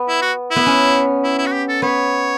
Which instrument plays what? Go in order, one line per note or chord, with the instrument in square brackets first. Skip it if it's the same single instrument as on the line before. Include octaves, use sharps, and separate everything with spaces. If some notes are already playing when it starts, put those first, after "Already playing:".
Already playing: [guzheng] B3
[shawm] E4
F#4
[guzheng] B3 [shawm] E4
[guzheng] C#4
[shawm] E4
E4
F#4
G4
A4
[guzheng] B3 [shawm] C#5